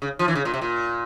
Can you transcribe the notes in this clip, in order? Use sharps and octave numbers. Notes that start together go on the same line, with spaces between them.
C#3
F3
E3
C#3
A#2
C3
A#2